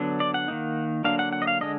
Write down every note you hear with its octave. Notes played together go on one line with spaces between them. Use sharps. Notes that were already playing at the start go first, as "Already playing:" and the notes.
Already playing: D3 F#3 B3 D4
D5
F#5
D#3 A#3 D#4
D3 F#3 A#3 D4 F5
F#5
F#5
D#5
F5
D3 G#3 D4 D#5